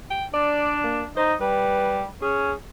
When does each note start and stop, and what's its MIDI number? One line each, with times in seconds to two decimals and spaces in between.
0.11 0.25 79
0.34 1.08 62
0.34 0.76 74
0.84 1.04 58
1.17 1.34 63
1.17 1.34 72
1.41 2.04 55
1.41 2.02 71
2.22 2.51 61
2.22 2.55 68